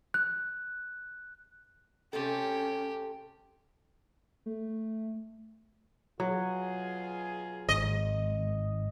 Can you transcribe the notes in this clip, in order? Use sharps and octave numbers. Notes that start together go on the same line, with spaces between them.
F#6
C3 A3 C#4 G4 A4
A3
B2 F#3 F4 G#4
G#1 D#5